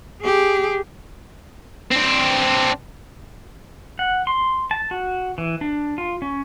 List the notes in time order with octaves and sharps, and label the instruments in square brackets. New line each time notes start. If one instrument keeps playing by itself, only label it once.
[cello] G4 G#4
[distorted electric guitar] C4 D4
[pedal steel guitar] F#5
C6
A5
F#4
E3
D4
F4
C#4